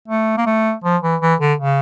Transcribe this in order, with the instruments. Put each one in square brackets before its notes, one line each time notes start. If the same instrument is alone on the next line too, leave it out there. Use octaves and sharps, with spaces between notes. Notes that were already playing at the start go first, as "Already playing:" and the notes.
[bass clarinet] A3
A#3
A3
F3
E3
E3
D3
C#3